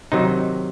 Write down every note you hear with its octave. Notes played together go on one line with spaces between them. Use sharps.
C3 D#3 F#3 D#4